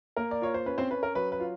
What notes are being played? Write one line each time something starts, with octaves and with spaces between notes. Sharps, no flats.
A#3 A#4
D5
F4 C#5
C5
C#4 B4
C4 C5
C#4 B4
A#4
F#3 B4
B4
F4